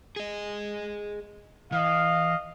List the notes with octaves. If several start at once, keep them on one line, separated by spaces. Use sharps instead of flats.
G#4 D#5
E3 D#5 F5